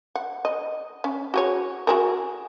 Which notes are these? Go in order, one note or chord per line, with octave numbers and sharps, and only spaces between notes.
F#5
D#5
C#4
F#4 G#4 C#5
F#4 G#4 A#4